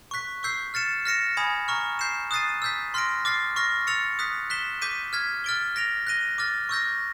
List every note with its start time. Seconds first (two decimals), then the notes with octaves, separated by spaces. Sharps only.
0.11 C#6 F#6 B6
0.43 C#6 E6 G6 C7
0.74 F6 A6 C#7 E7
1.05 F6 A#6 C#7 E7
1.37 G#5 B5 D#6 G#6
1.68 A#5 C#6 F6
1.99 G6 C7 E7
2.31 D#6 F#6 A6 C7 D#7
2.62 E6 G6 B6
2.94 C6 F6 A#6 D7
3.25 D6 F6 A6 C7
3.56 C#6 F6 A#6
3.87 E6 A6 C#7 F7
4.19 D#6 F#6 B6
4.50 F#6 B6 E7 G7
4.82 D6 G6 B6 D#7
5.13 F6 G#6 B6
5.44 F6 A6 D7 G7
5.76 F6 A#6 D7 F7
6.07 F#6 A#6 D#7 G7
6.38 D6 F6 A6
6.69 C#6 E6 G6 A#6